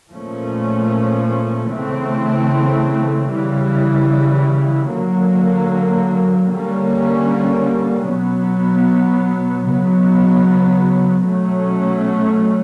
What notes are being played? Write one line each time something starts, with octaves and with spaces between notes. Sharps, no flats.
A#2 F3 A3 C#4
C#3 E3 A3 C4
C#3 E3 G3
D3 F#3 A#3
D3 G3 A#3 C#4
B2 F#3 B3
C#3 F#3 B3
B2 F#3 A3 C#4